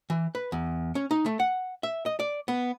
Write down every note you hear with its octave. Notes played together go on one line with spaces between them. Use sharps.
E3
B4
E2
C#4
D#4
A3
F#5
E5
D#5
D5
B3